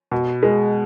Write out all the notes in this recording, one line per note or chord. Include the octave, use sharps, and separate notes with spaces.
B2
G#3